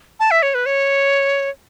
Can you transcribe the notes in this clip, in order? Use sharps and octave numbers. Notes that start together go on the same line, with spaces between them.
A5
E5
C#5
B4
C#5